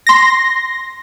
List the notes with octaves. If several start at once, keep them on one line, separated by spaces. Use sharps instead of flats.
C6 A#6